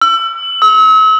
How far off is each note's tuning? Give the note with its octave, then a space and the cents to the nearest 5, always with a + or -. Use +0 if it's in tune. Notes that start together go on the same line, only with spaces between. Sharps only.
E6 +35
E6 -40